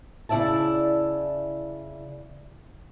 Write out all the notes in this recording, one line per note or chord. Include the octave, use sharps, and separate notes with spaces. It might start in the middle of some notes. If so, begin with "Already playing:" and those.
C#3 E4 D5 E5 A5